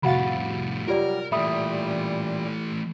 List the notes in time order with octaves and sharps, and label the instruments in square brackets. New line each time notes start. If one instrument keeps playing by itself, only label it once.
[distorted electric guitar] F2 A2 [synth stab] C3 F#4 A6 [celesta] F5 F#5 B5
[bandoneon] F#3 G3 [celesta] F4 G4 D5 [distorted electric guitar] A#4
[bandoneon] A#2 G3 [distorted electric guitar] E3 A3 [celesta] E5 B5 D#6